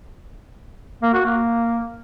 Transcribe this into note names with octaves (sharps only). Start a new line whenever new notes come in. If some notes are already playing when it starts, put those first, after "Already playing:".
A#3
F#4
A#3